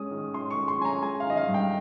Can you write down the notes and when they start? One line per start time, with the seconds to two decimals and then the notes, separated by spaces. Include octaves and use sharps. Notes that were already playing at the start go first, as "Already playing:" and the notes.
Already playing: G#3 C#4 D#6
0.11 D#3
0.34 C#4 C6
0.50 C#6
0.57 G#3
0.68 C6
0.79 C#4 G#5
0.85 A#5
1.02 G#3 G#5
1.20 F5
1.26 D#3 D#5
1.37 F5
1.48 G2
1.54 G5